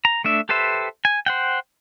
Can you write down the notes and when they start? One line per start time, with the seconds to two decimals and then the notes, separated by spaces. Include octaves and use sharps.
0.05 A#5
0.24 A3 D4 E5
0.49 G4 A4 B4 C5 E5
1.05 G#5
1.26 C5 F#5 G5